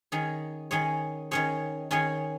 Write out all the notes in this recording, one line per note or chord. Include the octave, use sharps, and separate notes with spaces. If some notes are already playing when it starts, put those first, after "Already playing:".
D#3 C#4 G#4 C#5
D#3 C#4 G#4 C#5
D#3 C#4 G#4 C#5
D#3 C#4 G#4 C#5